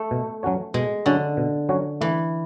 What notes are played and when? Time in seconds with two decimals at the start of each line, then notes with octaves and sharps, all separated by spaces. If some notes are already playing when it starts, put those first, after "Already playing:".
Already playing: A3
0.11 B2
0.43 F#3 C#4 F#4 C#5
0.74 B2 G#3
1.06 D3 F#3 C#4 F#4 C#5
1.37 B2
1.69 F#3 C#4 F#4 C#5
2.01 E3 A3